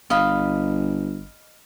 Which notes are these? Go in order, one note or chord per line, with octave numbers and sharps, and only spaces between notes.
G1 D#5 F5 B5